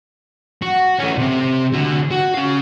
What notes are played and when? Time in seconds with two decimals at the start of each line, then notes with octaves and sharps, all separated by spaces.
0.62 F#4
0.99 A3 C#4
1.18 C3 C4
1.73 D3 F#4
2.11 F#4
2.34 C#4 F5